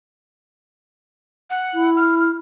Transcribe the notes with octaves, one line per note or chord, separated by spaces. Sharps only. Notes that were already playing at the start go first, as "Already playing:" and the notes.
F#5
E4
F6